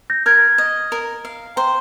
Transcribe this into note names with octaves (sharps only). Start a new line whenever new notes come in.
G6 A#6
A#4 F6 G#6
D#5
A#4
F5
C5 G5 A#5